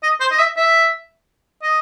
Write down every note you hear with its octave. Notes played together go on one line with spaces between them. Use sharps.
D#5
C5
D#5
E5
E5
D#5